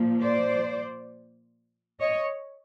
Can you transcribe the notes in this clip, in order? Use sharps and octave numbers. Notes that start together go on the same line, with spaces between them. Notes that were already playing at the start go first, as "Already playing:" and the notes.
Already playing: A#2 F3 A#3
C5 D5
C#5 D#5